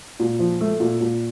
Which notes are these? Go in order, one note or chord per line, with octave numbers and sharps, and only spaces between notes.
A#2
F3
A3
A#2
A#2